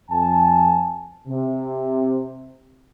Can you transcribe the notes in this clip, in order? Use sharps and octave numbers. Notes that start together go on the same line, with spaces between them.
F2 G#5 A5
C3